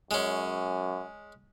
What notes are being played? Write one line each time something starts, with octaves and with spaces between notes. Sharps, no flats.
F#2 G#3 C#4